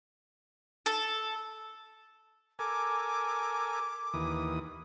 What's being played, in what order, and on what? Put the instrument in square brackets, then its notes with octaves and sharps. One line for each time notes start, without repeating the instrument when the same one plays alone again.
[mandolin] A4
[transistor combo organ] A4 A#4 G#5 [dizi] D6
[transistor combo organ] D#2 E3 D#6